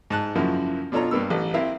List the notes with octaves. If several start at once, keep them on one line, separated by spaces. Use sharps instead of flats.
G#2 A5 F#6
F#2 C#3 F3 A#3 E4 F#4
B2 D4 F4 A4 C#5 A#5
G2 A#3 B3 E6
A1 A4
C4 E4 A#4 E5 F5